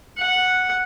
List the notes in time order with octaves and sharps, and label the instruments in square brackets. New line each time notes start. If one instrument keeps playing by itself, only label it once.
[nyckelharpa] F#5